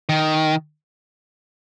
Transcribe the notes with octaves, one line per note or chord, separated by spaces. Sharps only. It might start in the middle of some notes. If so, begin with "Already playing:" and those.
D#3